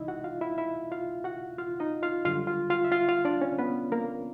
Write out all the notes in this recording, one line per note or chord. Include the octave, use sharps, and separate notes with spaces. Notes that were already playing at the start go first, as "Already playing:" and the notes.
Already playing: C2 C3 E3 G#3 D#4 E4 D#5 E5
F#4 F#5
F4 F5
E4 E5
E4 E5
F4 F5
F#4 F#5
F4 F5
D#4 D#5
F4 F5
F#2 D3 G3 F4 F5
F4 F5
F4 F5
E5
F4 F5
F4 F5
D4 D5
C#4 C#5
B3 B4
A#3 A#4